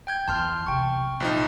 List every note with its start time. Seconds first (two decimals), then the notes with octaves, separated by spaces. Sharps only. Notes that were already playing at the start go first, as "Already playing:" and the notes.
0.07 G5 G6 G#6
0.28 E2 E3 A5 C6 F6
0.66 B1 C3 G5 C#6
1.20 A#1 F3 D#4